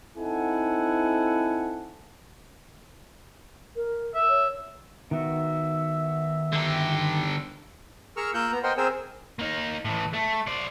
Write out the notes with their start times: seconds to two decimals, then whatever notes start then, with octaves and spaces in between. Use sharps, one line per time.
0.17 C4 D#4 E4 A4 F#5 G#5
3.76 A#4
4.15 E5
4.29 C#5
5.11 D#3 B3 F#4 E5
6.52 D3 G4
8.17 G#4 A#4 A#5 C#6 E6 F6
8.34 A#3 F4 A#4 E6 F#6 G6
8.52 B3 A#5
8.64 A#4 C5 D#5 F#5 G5 C6
8.78 C4 G#4 A#4 C5 G#5 E6
9.39 A#3 D#4
9.85 A2 E3
10.13 A3
10.47 C5 D5